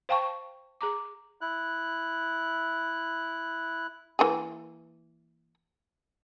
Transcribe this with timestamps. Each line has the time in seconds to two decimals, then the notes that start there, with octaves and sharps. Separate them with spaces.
0.09 C5 F5 G5 A5 C#6
0.81 G#4 A#5 D6
1.41 E4 F#6
4.19 E3 A#3 G#4